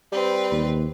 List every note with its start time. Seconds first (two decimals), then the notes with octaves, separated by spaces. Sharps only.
0.12 G3 C4 B4
0.52 D#2